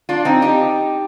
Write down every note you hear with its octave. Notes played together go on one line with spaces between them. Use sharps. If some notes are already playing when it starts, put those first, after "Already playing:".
D4 F4
C4 D#4
D#4 G4